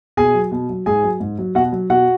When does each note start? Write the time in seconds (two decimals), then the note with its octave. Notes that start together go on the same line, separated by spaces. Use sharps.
0.17 B2 G#4 G#5
0.35 F#3
0.51 B2
0.69 F#3
0.86 G#2 G#4 G#5
1.03 F#3
1.20 G#2
1.39 F#3
1.55 B2 F#4 F#5
1.73 F#3
1.90 B2 F#4 F#5